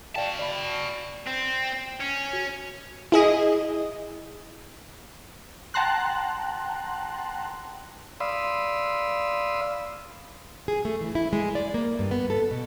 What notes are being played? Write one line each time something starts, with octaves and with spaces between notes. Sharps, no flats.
F#4 D5 F5 G5 A5
D5 B5
C4
C#4
F#4
E4 G#4 D#5
F#5 G5 A5 A#5 C6 F#6
D5 F5 B5 C6 D#6 E6
G#4
A3
E3
E4
G#3
D5
A#3
G2
B3
A4
B2